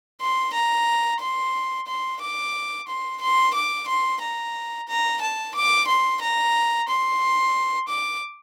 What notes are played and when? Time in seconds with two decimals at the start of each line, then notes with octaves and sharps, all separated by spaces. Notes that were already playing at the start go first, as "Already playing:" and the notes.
0.21 C6
0.54 A#5
1.20 C6
1.87 C6
2.21 D6
2.88 C6
3.22 C6
3.54 D6
3.88 C6
4.21 A#5
4.88 A#5
5.22 A5
5.55 D6
5.88 C6
6.22 A#5
6.89 C6
7.89 D6